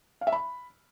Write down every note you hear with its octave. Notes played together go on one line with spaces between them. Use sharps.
F5
E5
B5